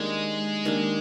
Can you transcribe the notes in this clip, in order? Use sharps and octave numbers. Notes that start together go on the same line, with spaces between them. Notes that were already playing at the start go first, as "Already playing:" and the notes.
Already playing: D#3 G3 G#3 A#3 D4
D#3 G3 A#3 D4